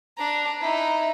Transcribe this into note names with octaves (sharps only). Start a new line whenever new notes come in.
D4 A#5
D#4 E4